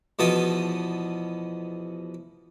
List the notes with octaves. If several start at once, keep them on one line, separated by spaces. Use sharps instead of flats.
E2 B2 F3 B3 D#5 A5